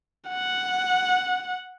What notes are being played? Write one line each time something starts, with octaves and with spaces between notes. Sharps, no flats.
F#5